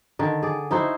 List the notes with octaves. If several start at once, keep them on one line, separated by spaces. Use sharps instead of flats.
D3 D#3
G#4 D5
D#4 E4 F#4 C5